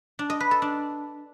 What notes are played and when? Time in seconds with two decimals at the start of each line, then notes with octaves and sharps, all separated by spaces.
0.19 D4
0.30 D#5
0.40 B4
0.51 A4
0.62 D4